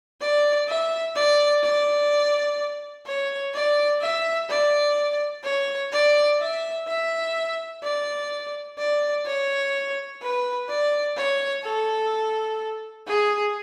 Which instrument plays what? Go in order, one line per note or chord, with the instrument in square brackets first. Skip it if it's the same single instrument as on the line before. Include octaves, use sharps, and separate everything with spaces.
[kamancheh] D5
E5
D5
D5
C#5
D5
E5
D5
C#5
D5
E5
E5
D5
D5
C#5
B4
D5
C#5
A4
G#4